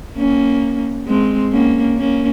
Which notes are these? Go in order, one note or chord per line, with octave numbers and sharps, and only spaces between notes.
A#3 C#4
G#3 C4
A#3 C#4
A#3 C#4